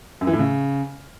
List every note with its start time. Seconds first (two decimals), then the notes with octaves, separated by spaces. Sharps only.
0.21 F#2
0.27 E3
0.33 A2
0.39 C#3